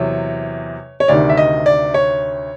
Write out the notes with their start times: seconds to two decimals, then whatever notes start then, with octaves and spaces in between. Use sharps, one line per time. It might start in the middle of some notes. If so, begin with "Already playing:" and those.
Already playing: E2 C3 F#3 C#5
1.00 C#5
1.08 D2 C3 D#3 D5
1.29 E5
1.38 D#5
1.66 D5
1.94 C#5